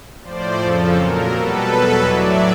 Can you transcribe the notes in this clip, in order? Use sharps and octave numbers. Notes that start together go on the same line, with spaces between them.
A2 F3 C5 D5
F2 C#3 F3 A4
A#2 F#3 A#4
B2 G3 A4 B4
E2 B2 F#3
A2 F#3 D5 E5